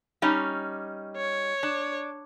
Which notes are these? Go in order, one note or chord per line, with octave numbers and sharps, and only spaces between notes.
G3 C#4 D#4
C#5
D4